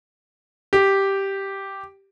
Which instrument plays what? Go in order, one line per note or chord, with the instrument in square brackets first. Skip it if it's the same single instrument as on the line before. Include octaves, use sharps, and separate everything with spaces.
[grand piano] G4